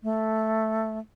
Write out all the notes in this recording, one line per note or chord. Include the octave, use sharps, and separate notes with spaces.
A3